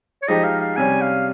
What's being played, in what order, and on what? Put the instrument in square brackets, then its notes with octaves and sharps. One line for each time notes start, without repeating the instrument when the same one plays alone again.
[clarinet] C#5
[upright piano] F3 G#3 D#4 G4 [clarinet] D#5
[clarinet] F5
F5
[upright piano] C3 G3 C#4 [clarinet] G#5
[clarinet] F5